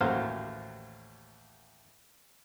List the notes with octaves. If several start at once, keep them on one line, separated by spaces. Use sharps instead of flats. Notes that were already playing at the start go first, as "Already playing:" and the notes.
A1 D#2 F#3 F#4 C5 F5